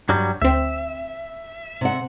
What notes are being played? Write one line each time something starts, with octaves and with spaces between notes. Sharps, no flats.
G2 F#3 G3
D2 C4 E5
C3 F#5